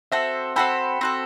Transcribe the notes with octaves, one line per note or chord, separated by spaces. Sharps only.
C4 F#4 A4 C5 E5
C4 F#4 A4 G5 B5
C4 F#4 A4